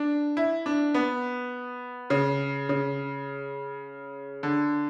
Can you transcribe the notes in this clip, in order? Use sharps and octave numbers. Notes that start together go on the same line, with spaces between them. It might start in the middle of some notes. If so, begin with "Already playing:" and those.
Already playing: D4
E4
D4
B3
C#3
C#3
D3